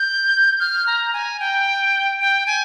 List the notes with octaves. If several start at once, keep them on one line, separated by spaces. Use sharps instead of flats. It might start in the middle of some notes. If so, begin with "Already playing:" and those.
Already playing: G6
F6
A#5
G#5
G5
G5
G#5